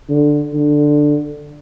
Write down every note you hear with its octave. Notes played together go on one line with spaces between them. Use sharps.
D3
D3